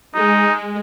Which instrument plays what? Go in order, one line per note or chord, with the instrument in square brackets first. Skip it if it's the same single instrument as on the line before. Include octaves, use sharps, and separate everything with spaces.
[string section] G#3 [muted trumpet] D#4